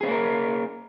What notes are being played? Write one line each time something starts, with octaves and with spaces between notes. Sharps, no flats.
A#3 C4 C#4 G#4 A#4